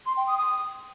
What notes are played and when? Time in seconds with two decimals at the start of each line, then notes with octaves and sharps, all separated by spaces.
0.06 C6
0.17 G5
0.27 D#6
0.38 D#6